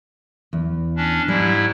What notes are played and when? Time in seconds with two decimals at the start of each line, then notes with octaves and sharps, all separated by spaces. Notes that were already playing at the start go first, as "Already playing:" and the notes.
0.53 E2
0.96 C#4 D4
1.28 G#2 G3 E4